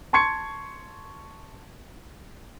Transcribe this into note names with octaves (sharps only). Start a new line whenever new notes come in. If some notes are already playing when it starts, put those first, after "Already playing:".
A5 C6 C#6 G#6 C#7